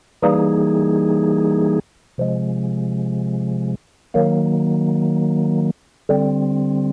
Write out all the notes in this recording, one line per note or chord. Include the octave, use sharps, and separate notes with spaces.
E3 G3 A#3 D#4 G#4
C3 F3 G#3
D#3 F#3 A#3
D3 G3 C4